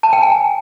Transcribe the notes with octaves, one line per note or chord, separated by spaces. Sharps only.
A5
G5
G#5